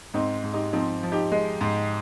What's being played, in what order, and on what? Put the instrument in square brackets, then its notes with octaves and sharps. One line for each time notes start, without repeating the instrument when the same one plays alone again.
[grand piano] G#2 C4 D#4
G#2
D#4 G4
F3 C4 D#4
F3
D#4 G4
G#3
G#2